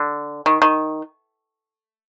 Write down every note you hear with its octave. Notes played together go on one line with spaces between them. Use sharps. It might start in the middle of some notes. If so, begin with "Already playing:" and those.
Already playing: D3
D#3
D#3